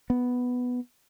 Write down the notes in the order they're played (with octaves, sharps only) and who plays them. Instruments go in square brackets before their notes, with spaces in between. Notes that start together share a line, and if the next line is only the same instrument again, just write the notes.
[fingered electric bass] B3